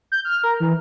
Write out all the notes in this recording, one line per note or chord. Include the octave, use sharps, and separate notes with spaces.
G6
F6
A#4
E3